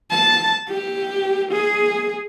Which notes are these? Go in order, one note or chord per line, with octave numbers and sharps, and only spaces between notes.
A5
G4
G#4